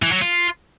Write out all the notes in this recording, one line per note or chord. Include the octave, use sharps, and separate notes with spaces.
E3
F#3
F4